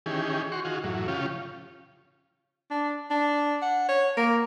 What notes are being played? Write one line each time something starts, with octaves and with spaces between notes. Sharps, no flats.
D#3 E3 C#4 G4 G#4
F#4 C6 C#6
D#3 F4 F#4 G#4
F#2 A2 E3 F#3
C#3 F3 C#4 F4 G4
D4
D4
F#5
C#5
A#3